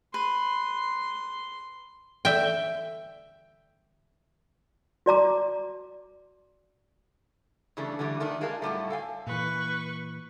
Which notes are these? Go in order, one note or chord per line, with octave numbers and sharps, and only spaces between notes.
B4 C6
E5 G5
F#4 D5 A#5 D6
C#3 E3 G3 A3 D4
D3 E3 G3 A3
B2 D#3 A3 D4 D#4
G#3 A#3 D4 F4 A#4 A5
A2 F#3 G3 A3
A4 F5 G5 G#5
A#2 E3 B4 C#6